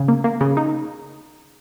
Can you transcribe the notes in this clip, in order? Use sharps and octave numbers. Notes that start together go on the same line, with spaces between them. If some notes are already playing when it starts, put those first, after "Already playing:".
Already playing: C#3
A#3
A#3
C#3
D#4